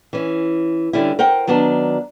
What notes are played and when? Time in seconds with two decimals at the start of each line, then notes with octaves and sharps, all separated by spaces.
0.13 E3 C#4
0.93 D3 G3 C#4 E4
1.19 A#4 C5 F#5 G5
1.47 D#3 F#3 B3 D4 A5